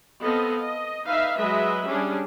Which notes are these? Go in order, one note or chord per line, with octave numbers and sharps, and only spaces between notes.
B3 C4 A4 D#5 F5
D#5
D#4 B4 E5 F5
F#3 G#3 B4 D#5 E5
G3 C#4 D4 G#4